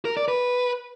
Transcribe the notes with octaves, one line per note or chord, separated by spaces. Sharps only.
A#4
D5
B4